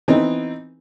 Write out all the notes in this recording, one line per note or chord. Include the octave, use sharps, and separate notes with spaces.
E3 B3 C4 D#4